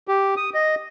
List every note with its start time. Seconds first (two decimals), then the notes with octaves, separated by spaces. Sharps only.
0.08 G4
0.37 D#6
0.54 D#5